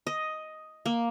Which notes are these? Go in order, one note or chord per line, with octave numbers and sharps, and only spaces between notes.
D#5
A#3